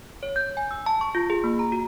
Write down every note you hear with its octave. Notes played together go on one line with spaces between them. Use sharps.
C#5
G6
G#5
E6
A5
C#6
F4
G#4
A#3
A#5
F#4